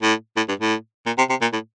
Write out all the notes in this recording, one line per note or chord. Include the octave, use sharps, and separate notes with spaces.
A2
A2
G2
A2
A#2
C3
C3
A#2
A2